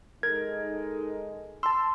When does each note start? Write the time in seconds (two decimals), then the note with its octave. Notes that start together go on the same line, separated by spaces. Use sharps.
0.23 G#3 D#4 A4 A#4 G#6
1.63 A5 C6 E6